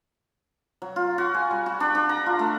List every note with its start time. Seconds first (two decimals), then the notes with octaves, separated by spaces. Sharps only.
0.82 F#3
0.96 F4
1.18 F#4
1.34 G#5
1.51 G3
1.66 F#4
1.80 D4
1.95 D4
2.09 A#5
2.26 F4
2.39 A3